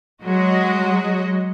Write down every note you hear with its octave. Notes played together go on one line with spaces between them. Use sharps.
F#3 G#3 F#4 D#5